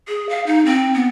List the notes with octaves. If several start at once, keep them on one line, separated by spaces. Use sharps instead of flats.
G#4
F5
D#4
C4
B3